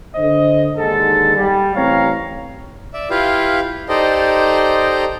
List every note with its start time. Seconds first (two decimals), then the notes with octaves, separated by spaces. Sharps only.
0.15 D3 C5 D#5
0.76 D#2 G#2 D3 A4
1.36 G3
1.76 A1 C4 C#5 F5 A#5
2.93 D5 E5
3.10 E4 F4 G4 B4 F5
3.89 D#4 G4 A4 C5 D5 D#5